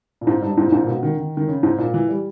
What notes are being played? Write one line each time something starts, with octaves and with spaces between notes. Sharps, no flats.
A#2
G#2
G2
G#2
A#2
G#2
A#2
B2
D#3
D#3
D#3
C#3
G#2
A#2
E3
G3